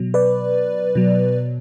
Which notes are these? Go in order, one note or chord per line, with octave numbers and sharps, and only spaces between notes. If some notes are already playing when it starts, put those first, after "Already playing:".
Already playing: B2 F#3
B4 D5
B2 F#3